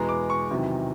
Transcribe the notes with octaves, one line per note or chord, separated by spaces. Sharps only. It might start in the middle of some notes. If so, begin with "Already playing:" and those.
Already playing: E2 B2 G#3 B3 A#5
D6
C#6
E2 C3 D#3 F#3